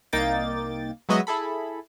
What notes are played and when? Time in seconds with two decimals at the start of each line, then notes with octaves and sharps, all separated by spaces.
0.13 C2 A#3 D#4 G5 D6 A6
1.09 F#3 G#3 B3 F#4 D#5 E5
1.27 E4 G#4 A4 B5